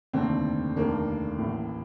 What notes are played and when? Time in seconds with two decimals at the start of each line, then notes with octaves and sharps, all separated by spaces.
0.13 F1 D#2 D3 C4
0.76 F1 D#2 D3 A#3
1.38 A1 A2